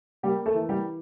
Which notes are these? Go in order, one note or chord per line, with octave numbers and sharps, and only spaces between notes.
G3 A#3 G4
A3 A4
E3
G3 G4